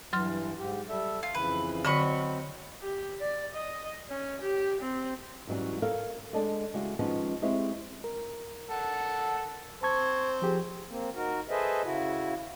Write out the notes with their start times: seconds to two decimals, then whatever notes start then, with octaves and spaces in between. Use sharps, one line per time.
0.13 G2 E3 F#3 C6 F6
0.59 G#2 G4
0.89 G3 A4 E5
1.23 F4
1.35 F2 C#3 E3 B4
1.85 D3 F#3 C4 D#5 B5 C#6
2.82 G4
3.21 D5
3.54 D#5
4.10 C#4
4.41 G4
4.81 C4
5.47 G#2 E3 F#3 G3 C#4
5.82 A4 A#4 C#5 F5
6.33 G#3 D4 A4 D5 D#5
6.74 C#3 G3 G#3 E4 F#4
6.99 D#3 F3 G#3 B3 C#4 D#4
7.42 G#3 C4 E4 G4 C#5
8.04 A#4
8.71 A4 F#5
9.83 C4 C5 A5 C#6 G#6
10.42 F3 G4 G#4
10.89 A#3 C4
11.15 D#4 F#4 A#4
11.50 G#4 A4 B4 C5 D#5 E5
11.84 C#3 E4 F#4